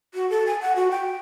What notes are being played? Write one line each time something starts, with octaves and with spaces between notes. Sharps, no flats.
F#4
A4
G#5
F#5
F#4
G5